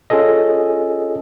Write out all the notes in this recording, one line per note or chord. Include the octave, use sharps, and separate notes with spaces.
C#4 F4 G#4 A4 D#5